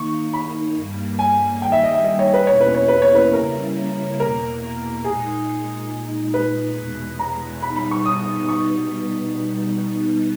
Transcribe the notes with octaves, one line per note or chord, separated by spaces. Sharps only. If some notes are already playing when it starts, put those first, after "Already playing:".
Already playing: D#3 A#3 D#4 C#6
B5
G2 G3 A#3
G#5
D#3 G3 A#3 G5
E5
D#5
E5
D#5
C#5
B4
E2 B2 A#3 C#4 E4 C#5
B4
C#5
B4
C#5
B4
C#3 G3 A#3 C#4 E4 A#4
E2 B2 A#3 A#4
A#2 G#3 D#4 G#4
A#2 G#3 D#4
B4
E2 B2 G#3
A#5
B2 G3 B3 D#4 B5
B5
C#6
D#6
C#6